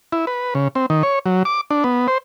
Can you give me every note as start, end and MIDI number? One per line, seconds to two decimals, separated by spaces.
0.13 0.25 64
0.27 0.54 71
0.55 0.68 49
0.75 0.86 60
0.90 1.03 51
1.03 1.19 73
1.26 1.43 54
1.45 1.61 86
1.71 1.84 62
1.84 2.07 59
2.08 2.18 72